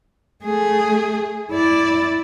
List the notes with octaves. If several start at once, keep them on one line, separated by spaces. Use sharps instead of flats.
A3 G#4
E4 D5